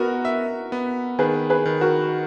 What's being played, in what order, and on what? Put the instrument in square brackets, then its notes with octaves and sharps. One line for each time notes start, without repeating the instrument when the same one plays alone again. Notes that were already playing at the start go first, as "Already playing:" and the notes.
Already playing: [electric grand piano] B3 [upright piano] F#4 A#4
[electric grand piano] E5
B3
[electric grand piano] D#3 [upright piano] G#4 B4
[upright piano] G#4 B4
[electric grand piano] D#3
[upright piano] F#4 A#4